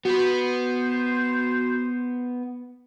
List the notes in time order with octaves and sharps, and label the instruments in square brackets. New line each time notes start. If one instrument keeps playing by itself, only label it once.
[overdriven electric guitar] B3 B4 [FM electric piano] F#4 [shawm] C5